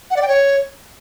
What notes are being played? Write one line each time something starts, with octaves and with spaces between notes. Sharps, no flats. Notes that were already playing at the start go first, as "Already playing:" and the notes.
F#5
D5
G5
C#5